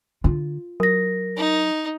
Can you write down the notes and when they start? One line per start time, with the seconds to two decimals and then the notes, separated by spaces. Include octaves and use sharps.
0.24 D3 F4
0.80 F#3 A#4 A#6
1.37 D#4